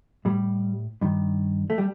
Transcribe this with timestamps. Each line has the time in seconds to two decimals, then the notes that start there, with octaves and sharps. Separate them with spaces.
0.25 A2 G3
1.01 G2 D#3
1.70 A3
1.78 G3